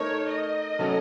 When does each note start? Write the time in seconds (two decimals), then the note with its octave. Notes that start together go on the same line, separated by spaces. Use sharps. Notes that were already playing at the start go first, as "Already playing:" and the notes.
Already playing: A3 D#4 A#4 C#5
0.32 D#5
0.79 F#3 A3 C#4 A4